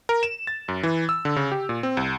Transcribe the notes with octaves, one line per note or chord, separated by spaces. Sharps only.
A#4
E7
A6
F#2
E3
E6
D3
C#3
G4
A#2
C4
C2